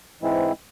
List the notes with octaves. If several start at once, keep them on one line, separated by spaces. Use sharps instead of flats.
G#2 E3 G#3 C4 E4